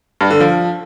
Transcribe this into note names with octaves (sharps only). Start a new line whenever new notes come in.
G2
D3
F3